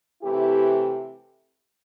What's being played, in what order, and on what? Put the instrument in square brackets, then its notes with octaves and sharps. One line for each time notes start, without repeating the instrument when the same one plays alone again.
[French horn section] C3 E3 A3 E4 G4